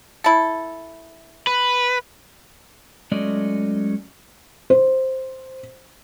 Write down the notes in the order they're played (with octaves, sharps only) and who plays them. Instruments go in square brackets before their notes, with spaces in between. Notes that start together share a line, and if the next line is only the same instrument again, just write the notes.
[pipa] E4 A4
[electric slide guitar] B4
F#3 G#3 A3 C#4 D5 D#5
[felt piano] C5